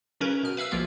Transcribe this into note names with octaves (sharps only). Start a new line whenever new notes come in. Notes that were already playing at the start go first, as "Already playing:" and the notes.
C#3 F#3 C#4 A#4 B4
B2 F6
B4 E5 F5 E6
B1 F3 A#3 F4 E5